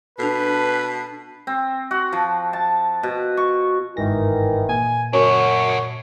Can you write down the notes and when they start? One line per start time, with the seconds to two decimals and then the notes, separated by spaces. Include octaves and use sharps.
0.19 B2 D4 A4 B4 A5
1.47 C4
1.91 F#4
2.13 F3
2.53 A5
3.03 B2
3.37 C#6
3.97 G1 G#2 D#3 E3 A#6
4.69 A#2 G#5
5.13 F#2 D4 F#4 C#5